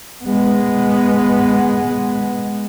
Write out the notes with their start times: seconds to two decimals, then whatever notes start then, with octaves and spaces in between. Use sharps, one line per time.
0.24 G#3 B3